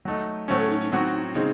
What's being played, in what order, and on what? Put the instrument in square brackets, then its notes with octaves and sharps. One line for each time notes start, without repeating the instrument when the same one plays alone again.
[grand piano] F#3 A3 D#4
[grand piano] A2 F#3 A3 C#4 [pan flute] C5
[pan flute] A4
D#4
D#4
[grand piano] A2 F#3 C4 F#4 [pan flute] D#4
[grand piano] C#3 G#3 C4 [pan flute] D#4